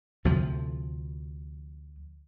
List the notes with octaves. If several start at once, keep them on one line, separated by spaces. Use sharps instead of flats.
D2 C3 F3